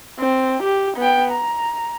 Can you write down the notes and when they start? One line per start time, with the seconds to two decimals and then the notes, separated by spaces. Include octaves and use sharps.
0.19 C4
0.63 G4
0.97 B3 G5
1.32 A#5